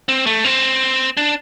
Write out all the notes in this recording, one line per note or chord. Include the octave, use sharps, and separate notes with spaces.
C4
A3
C4
D4